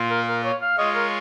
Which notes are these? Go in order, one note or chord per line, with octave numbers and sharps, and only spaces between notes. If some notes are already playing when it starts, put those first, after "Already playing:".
Already playing: A#2 A#3 F4
A#4
A#4
C#5
F5
G#3 F4 C#5 D#5
A#4